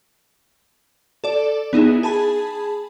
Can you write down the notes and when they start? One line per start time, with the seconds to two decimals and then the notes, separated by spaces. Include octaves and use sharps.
1.24 A4 D5
1.73 B3 D#4 E4 G#4
2.03 G#4 A5 B5